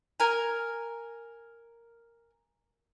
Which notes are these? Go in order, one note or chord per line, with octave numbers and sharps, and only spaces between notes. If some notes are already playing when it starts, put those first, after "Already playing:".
A#4 G#5